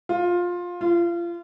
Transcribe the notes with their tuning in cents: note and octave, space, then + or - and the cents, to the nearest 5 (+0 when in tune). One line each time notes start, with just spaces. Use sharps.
F4 +15
F4 -30